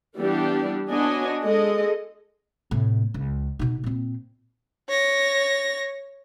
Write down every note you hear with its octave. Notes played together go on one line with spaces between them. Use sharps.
E3 G3 B3 D4 G4
B3 D4 F#4 C#5 D#5 G#5
G#3 A4 D#5
A2 C3
C#2
B2 D#4
A#2 C4
C#5 A#6